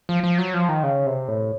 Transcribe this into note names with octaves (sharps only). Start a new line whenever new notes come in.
F3
F3
F#3
F3
D#3
C#3
C3
A2